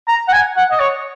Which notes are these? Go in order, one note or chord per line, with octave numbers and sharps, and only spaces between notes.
A#5
F#5
G#5
F#5
D#5
C#5